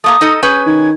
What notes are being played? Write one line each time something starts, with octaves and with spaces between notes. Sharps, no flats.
A3 A#3 A#5 D#6
D#4 A4 D#5
C#4 G#4 B4 G6
D#3 G#6